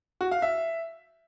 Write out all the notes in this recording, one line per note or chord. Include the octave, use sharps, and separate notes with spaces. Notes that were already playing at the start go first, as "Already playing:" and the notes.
F#4
F5
E5